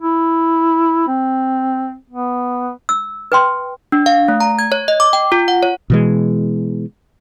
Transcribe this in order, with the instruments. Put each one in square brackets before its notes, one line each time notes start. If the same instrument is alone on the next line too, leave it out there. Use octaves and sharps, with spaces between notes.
[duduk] E4
C4
B3
[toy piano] E6
B4 G5 C6
[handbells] D4
F5
A3
A#5
G#6
C#5
D#5
D6
G5
F4
F#5
C#5
[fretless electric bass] B2 E3 G#3